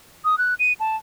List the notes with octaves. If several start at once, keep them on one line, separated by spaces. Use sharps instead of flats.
D#6
F#6
D#7
A5